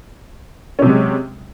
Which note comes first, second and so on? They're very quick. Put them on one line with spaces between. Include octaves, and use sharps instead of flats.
C#4 C3 F#3 G#3